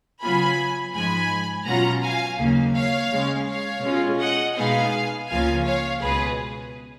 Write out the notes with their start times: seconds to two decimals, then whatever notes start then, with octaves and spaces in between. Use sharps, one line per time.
0.21 C#3 F#3 B3 F4 G#5 B5
0.94 G#2 F3 G#3 G#5 B5
1.66 B2 F#3 C#4 F4 F#5 A#5
2.03 F5 G#5
2.39 D#2 C#3 F#3 A#3
2.76 C#5 F5
3.11 C#3 G#3 C#4
3.48 C#5 F5
3.84 B2 G#3 C#4 F4
4.20 D#5 F#5
4.57 B2 G#3 B3 D#4 F5 G#5
5.29 C#2 C#3 F3 A#3 F4 F5 G#5
5.65 C#5 F5
6.02 C#2 B2 G#3 G#4 B4